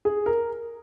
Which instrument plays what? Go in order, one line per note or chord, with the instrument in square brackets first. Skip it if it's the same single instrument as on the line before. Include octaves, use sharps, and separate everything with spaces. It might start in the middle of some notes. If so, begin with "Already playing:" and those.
[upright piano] G#4
A#4